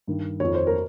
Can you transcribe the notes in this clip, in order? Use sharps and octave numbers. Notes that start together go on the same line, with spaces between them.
G2 D#3
F2 D#3 C#5
C5
A#4